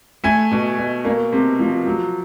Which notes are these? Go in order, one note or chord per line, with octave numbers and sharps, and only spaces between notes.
A3 G#5
B2
B2
A#3
C3
F3
F#3